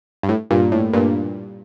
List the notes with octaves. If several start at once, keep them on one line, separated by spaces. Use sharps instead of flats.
G2
A2
G2 A#2
A2
G2 A#2